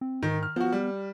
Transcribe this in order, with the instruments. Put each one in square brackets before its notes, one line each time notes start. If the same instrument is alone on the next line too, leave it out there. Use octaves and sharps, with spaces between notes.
[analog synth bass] C4
[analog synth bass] G#2 [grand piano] D#3
[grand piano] F6
[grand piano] F3 F#4 [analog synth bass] B3
[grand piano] G3